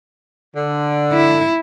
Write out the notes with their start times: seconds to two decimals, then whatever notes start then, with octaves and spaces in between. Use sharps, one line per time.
0.56 D3
1.13 E4